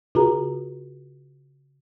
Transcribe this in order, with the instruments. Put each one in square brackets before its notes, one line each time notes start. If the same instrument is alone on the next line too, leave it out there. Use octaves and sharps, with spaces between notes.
[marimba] C#3 F4 F#4 G#4 A#5